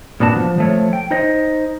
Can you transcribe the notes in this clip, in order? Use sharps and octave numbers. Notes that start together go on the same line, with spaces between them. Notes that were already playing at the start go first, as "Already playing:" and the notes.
A#2 B3 D4 F#4 A5
F3
F3 A3 C#5
G5
D#4 C5 D#5